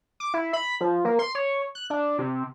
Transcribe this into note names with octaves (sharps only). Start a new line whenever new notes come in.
D6
E4
B5
F3
A#3
C6
C#5
F#6
D4
C3